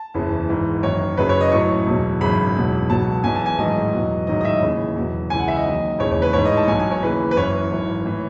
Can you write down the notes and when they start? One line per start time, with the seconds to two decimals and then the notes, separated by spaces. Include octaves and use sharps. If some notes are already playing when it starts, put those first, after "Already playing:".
Already playing: A5
0.14 F#1 E2 C#3 E3
0.49 G#1 G#2 E3
0.83 F#1 F#2 D#3 C#5
1.17 F#1 F#2 C#3 F#3 B4
1.29 C#5
1.41 D#5
1.52 A1 A2 F#3 C#6
1.87 E1 E2 B2 F#3
2.20 G#1 F#2 C#3 F#3 B5
2.56 E1 E2 B2 F#3
2.89 C#2 B2 F#3 A5
3.24 E1 E2 B2 F#3 G#5
3.35 A5
3.46 G#5
3.58 A1 G#2 D#3 F#3 D#5
3.93 E2 B2 F#3
4.27 A1 G#2 D#3 F#3 D#5
4.41 D#5
4.45 E5
4.62 D#2 C#3 E3
4.95 E2 B2 F#3
5.30 C#2 C#3 E3 G#5
5.39 F#5
5.48 E5
5.57 D#5
5.65 D#2 D#3 F#3
5.99 E1 D#2 C#3 E3 C#5
6.11 C#5
6.22 B4
6.33 A1 G#2 E3 C#5
6.45 D#5
6.57 A5
6.68 B1 B2 F#3 G#5
6.79 G#5
6.91 C#5
7.03 D#2 C#3 E3 B4
7.31 B4
7.37 F#1 F#2 E3 C#5
7.71 G#1 F#2 E3
8.05 A2 E3